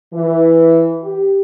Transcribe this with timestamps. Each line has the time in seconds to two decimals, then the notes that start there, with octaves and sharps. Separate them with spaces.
0.13 E3
1.02 G4